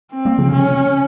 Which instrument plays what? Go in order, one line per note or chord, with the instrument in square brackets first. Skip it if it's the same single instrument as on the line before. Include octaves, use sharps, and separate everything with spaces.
[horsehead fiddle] C4
[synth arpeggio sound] G3 A#3
C#3 F3
[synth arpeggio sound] C3 [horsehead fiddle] C#4